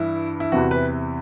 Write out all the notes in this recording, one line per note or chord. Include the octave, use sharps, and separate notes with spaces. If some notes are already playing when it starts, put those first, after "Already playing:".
Already playing: G2 E3 E4
E4
E2 C3 E3 F#4
B4